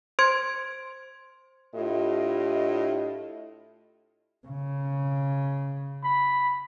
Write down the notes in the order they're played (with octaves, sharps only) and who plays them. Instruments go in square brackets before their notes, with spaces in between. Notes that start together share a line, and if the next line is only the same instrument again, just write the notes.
[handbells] C5 C6 G#6 D7
[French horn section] A2 D4 E4 F4 G4 D#5
[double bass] C#3
[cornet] B5